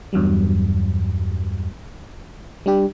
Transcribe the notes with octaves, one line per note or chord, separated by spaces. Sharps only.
E2 G2 F#3 G3
G3 D4 G4